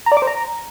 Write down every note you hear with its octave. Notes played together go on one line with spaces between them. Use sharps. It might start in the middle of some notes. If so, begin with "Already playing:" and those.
A#5
D5
D6
C5
A#5